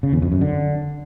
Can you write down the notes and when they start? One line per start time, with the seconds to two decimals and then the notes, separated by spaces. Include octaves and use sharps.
0.03 C#3
0.13 E2
0.22 F2
0.32 F#2
0.41 D3